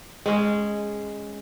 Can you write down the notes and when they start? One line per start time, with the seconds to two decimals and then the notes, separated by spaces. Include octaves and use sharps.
0.26 G#3 C#4